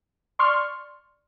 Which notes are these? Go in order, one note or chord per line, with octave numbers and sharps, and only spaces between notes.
D5 C6 C#6 F6